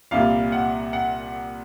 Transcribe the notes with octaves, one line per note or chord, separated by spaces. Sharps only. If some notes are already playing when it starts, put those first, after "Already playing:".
C2 A#2 G3 F5
F#5
F#5